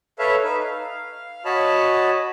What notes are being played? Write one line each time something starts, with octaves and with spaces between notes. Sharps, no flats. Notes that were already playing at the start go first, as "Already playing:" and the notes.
A4 B4 C#5 E5 F5
D#4 B4
F5
F#4 C#5 D#5 A5 B5